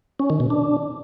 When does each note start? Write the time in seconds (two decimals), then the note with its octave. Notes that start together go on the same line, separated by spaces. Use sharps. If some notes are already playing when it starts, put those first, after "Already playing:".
0.19 C#4
0.30 D#3
0.40 B2
0.50 D4